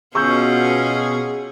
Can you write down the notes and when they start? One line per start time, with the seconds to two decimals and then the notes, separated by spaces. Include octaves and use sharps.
0.15 B2 C#4 F4 G#4 C#6 E6 G6